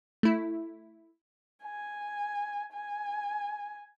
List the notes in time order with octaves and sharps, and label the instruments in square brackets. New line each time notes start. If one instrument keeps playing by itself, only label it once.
[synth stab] A3 E4
[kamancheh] G#5
G#5